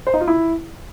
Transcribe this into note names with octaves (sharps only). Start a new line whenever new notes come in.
C5
D#4
F4
E4